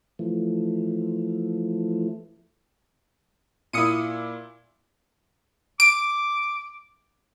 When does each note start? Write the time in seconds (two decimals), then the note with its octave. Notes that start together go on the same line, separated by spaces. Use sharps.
0.19 E3 F3 A3
3.73 A#2 E4 D#6 C#7 D#7
5.80 D6 D7